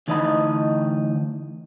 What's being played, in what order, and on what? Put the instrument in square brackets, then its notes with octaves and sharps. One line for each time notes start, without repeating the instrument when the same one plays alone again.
[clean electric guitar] D2 E3 D#4 D#5 A5 B5